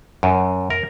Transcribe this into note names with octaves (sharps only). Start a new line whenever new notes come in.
F#2
A#4